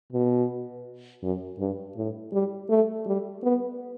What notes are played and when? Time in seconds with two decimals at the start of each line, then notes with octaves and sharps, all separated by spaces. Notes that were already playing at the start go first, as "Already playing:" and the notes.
0.12 B2
1.23 F#2
1.59 G2
1.97 A2
2.33 G3
2.70 A3
3.06 G3
3.43 B3